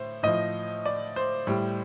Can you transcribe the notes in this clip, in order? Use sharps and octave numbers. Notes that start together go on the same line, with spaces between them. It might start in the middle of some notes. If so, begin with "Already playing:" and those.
Already playing: A2 C5
A2 F3 D#5
D5
C5
A2 G3